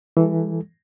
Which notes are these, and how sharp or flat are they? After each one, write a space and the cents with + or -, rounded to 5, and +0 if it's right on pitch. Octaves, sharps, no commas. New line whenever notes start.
E3 +0 G3 +45 A4 +0